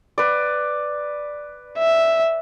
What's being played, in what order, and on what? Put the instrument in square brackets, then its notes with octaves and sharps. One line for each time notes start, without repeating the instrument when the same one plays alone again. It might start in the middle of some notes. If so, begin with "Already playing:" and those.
[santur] B4 D5
[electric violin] E5